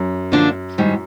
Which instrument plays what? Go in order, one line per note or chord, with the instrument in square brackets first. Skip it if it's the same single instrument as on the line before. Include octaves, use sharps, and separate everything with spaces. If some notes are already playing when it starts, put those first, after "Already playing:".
Already playing: [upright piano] F#2
[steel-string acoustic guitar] D3 F3 A#3 D4 F4
G#2 D#3 G3